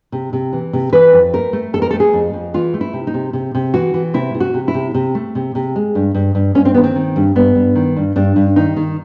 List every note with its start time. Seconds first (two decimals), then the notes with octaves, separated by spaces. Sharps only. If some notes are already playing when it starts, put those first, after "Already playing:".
0.12 C3
0.33 C3
0.53 E3
0.73 C3
0.93 E3 B4
1.12 F2
1.33 A3 A#4
1.53 A3
1.73 F2 A4
1.82 A#4
1.91 A4
1.93 A3
2.00 G#4
2.13 F2
2.33 F2
2.54 E3 F4
2.74 A3
2.81 E4
2.93 C3
3.07 D#4
3.14 C3
3.33 C3
3.55 C3
3.74 E3 F#4
3.94 E3
4.14 C3 E4
4.34 C3
4.40 F#4
4.54 C3
4.68 E4
4.74 C3
4.94 C3
5.15 A3
5.35 C3
5.55 C3
5.76 G#3
5.95 G2
6.15 G2
6.35 G2
6.55 G2 C#4
6.65 C4
6.74 D#3 B3
6.84 C4
6.95 D#3
7.16 G2
7.35 G2 B3
7.55 G2
7.75 D#3
7.96 G2
8.16 G2 D4
8.36 G2
8.56 D#3 D#4
8.76 D#3